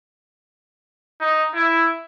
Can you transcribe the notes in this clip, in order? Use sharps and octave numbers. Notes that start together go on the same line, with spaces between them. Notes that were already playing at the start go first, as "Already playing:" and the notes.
D#4
E4